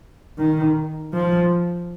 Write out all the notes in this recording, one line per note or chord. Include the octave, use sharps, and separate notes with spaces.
D#3
F3